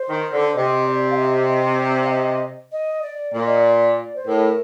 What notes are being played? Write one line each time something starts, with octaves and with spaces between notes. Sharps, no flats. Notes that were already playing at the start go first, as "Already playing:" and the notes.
Already playing: C5
D#3
D3
C3 D#5
D5
F5
D#5
D#5
D5
F5
D#5
D#5
D5
A#2 D5
D#5
D5
C5
A2 A#4